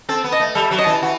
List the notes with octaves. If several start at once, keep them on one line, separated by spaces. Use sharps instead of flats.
C4 A4
B3
D#5 A5
A3
G3 A4
F#3
D#5
E3 A5
E3 F#4